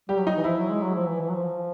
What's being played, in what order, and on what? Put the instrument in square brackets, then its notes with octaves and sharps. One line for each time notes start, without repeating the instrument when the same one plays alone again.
[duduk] G3 [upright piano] G4
[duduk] F#3
[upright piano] D#4
[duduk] E3
[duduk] F3 [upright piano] E4
[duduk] F#3
G#3
F#3
F3
E3
E3
F#3
F3